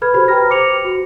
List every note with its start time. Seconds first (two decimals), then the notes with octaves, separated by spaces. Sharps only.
0.02 A4 B4 B5 F6 G#6
0.14 F#4 G4 C5 B5
0.28 B4 G5 A#5 B5 F6 A#6
0.49 C5 D6 C#7 F7
0.85 F#4